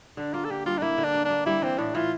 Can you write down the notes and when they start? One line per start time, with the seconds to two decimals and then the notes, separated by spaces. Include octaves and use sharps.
0.17 D3 D4
0.33 A#3 F4
0.45 A4
0.50 D3 G4
0.66 G3 F4
0.78 D4
0.82 A#3 E4
0.98 D3
1.04 D4
1.14 A#3
1.25 D4
1.30 A#3
1.46 G3 E4
1.62 E3 C4
1.78 A2 D4
1.95 E3 F4